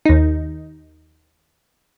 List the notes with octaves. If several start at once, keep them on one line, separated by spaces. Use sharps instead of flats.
D#2 D#4